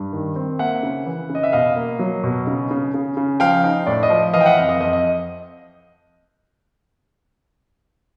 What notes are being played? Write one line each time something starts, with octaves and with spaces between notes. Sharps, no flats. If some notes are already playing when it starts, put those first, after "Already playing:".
Already playing: G2
D#3
C4
A#3 E5 F#5
C#3
E3
C#3
D#5
E5
B2 D#5 F5
A#3
F#3
B2
C#3
C#3
C#3
C#3
F3 F5 G5
D#4
A2 D5
D#5
F3
E3 D#5 F5
G5
E5 F#5
F2 D#5 F5
D#5
F2 D#5
D#5